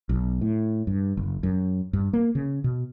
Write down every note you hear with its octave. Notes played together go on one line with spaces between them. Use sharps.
B1
A2
G2
F#1
F#2
G2
A#3
C#3
B2